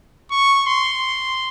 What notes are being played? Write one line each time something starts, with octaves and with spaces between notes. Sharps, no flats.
C#6
C6